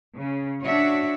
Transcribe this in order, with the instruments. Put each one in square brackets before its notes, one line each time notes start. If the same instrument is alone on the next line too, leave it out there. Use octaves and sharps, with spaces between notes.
[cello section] C#3
D4 F#4 C#5 E5